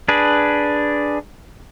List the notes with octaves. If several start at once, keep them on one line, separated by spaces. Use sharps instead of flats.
D4 G#4 B4